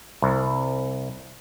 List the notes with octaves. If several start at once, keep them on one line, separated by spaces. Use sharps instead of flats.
C2